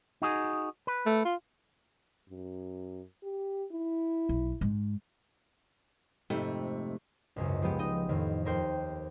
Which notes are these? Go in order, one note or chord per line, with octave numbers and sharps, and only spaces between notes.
D#4 F#4 G#4
B4
A3
F4
F#2
G4
E4
B1
G#2
F2 G#2 C3 A3
G#1 C#2 F#2
F3 G#3 B3 G4
D#4 D#5
F2 A2 D#3 F3
D#2 A#4 C5 G5